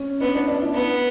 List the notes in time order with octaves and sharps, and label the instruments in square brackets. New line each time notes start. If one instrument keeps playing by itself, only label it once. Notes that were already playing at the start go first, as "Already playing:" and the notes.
Already playing: [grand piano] C#4
[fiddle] B3 [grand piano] D4
[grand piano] D4
D4
E4
[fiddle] B3